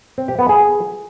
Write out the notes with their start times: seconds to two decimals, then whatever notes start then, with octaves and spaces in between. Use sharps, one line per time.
0.18 C4
0.28 G4
0.39 B3
0.49 G#4